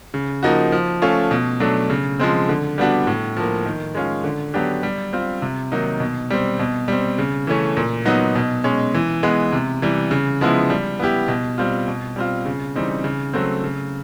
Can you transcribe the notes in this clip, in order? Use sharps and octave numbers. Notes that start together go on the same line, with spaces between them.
C#3
F3 A#3 D#4 F#4
F3
A3 C#4 F4
B2
F#3 A3 D4
C#3
F3 G#3 C4
D3
G3 B3 D4 F#4
A2
F3 A#3
D#3
G#3 C#4 F4
D3
F#3 B3 D4 G4
G3
C4 F4
C3
D#3 F#3 A#3 D#4
B2
G3 C4
B2
G3 C4
C#3
E3 A3 C#4
A#2
F#3 B3 D#4
B2
G#3 C#4
E3
G#3 B3
C3
E3 G3
C#3
F3 G#3 B3 E4
G3
B3 E4 G4
B2
G3 C4 F4
B2
G3 C4 F4
C#3
E3 G3 C4 D#4
C#3
F#3 A3 C4
C#3